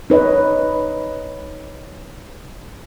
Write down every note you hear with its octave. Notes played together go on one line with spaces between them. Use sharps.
D#4 B4 C#5 D#5